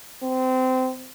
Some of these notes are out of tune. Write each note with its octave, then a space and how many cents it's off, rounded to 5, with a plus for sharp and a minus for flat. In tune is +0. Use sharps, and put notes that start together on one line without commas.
C4 -25